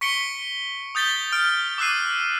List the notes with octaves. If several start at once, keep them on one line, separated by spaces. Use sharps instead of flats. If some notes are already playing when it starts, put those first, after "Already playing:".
C#6 B6 C#7 D7 G7
D#6 G6 A6 B6 G7
F6 D7
D6 E6 F#6 C7 D#7